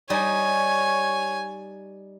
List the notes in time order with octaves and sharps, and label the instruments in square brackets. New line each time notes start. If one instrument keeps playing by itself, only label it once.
[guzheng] G3 D#4 [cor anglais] C#5 [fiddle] G#5